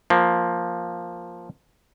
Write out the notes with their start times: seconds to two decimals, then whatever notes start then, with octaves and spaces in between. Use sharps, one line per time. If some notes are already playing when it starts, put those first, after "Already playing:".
0.10 F3 A#3